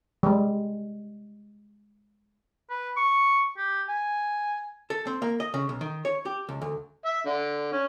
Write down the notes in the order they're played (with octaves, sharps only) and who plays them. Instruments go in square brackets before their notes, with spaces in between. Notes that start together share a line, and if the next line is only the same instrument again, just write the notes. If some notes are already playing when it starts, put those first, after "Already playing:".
[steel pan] G3 G#3
[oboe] B4
C#6
G4
G#5
[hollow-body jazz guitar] A4
C4
A#3
D#5
C#3
B1
D#3
C#5
G4
C#2
D2
[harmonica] E5
D3
C#4